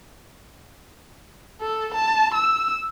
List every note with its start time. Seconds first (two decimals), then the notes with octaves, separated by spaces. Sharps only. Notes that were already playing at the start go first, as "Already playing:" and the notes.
1.61 A4
1.95 A5
2.35 E6